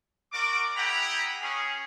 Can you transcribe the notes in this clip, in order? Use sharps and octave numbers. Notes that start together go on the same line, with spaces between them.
F#4 A#4 D5 D6
E4 G#4 F#5 G5 A#5 B5
C#4 G#4